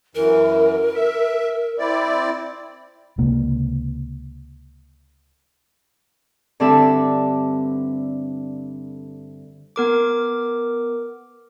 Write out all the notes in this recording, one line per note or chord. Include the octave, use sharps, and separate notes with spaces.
F#2 E3 A#4
E5
C4 E4 D5
C#2 C3 A#3
G2 D3 C4 D4 A4 E5
B3 A#4 D6